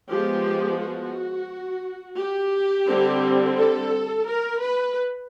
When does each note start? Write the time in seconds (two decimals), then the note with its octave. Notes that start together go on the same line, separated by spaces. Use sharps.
0.10 F3 G#3 B3 G4
0.80 F#4
2.19 G4
2.89 D3 G3 C4
3.58 A4
4.27 A#4
4.62 B4